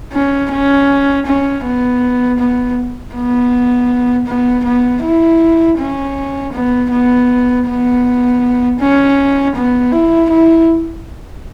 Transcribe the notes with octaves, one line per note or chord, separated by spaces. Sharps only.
C#4
C#4
C#4
B3
B3
B3
B3
B3
E4
C#4
B3
B3
B3
C#4
B3
E4
E4